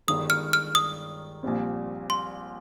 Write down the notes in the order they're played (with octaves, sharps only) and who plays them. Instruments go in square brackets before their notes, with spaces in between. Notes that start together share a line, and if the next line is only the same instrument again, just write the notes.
[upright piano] G1 G2 D#3 G#3 [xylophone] D#6
[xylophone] F6
F6
D#6
[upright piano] A#1 A#2 G3 C4
[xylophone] C6